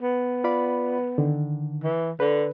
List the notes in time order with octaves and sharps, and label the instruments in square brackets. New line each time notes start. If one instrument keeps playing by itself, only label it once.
[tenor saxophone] B3
[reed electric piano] F4 D5 B5
D3 D#3
[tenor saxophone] E3
[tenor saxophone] D3 [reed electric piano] B4